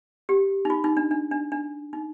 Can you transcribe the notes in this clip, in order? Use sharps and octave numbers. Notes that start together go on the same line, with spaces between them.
G4
D#4
F4
D#4
D4
D4
D4
D4
D#4